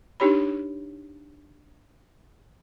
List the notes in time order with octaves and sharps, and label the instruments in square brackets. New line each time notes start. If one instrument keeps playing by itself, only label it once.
[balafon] D4 D#4 G4 C#5 B5